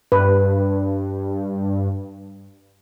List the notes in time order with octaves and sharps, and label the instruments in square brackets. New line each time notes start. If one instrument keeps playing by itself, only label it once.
[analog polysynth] G2 [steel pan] B4